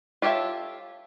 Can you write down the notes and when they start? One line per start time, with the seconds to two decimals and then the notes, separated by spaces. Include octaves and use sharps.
0.22 F4 G4 A4 C#5 E5